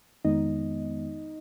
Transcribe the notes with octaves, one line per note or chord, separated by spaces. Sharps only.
F2 D#3 G#3 B3 D#4 D#5